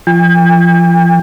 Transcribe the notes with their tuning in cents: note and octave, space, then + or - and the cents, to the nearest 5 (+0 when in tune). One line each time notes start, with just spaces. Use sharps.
F3 -20 G5 +45